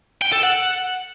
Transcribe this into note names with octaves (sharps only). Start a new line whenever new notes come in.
G5
A4
F#5